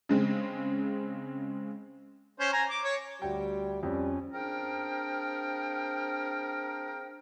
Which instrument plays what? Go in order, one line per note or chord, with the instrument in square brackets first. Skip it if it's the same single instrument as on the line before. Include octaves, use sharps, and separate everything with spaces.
[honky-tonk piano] C#3 G#3 C4
[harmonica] C#4 C5
G#5 A#5
D6
C#5
[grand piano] D2 F#4 G5 [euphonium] G3
[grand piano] F2 [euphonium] G3 [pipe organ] C#4
[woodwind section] C4 D4 G#4 A#4 F5 G5